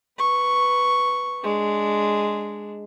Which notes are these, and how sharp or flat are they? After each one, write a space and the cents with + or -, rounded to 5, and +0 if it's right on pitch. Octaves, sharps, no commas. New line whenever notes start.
B4 +0 C#6 +0
G#3 +0 D4 +0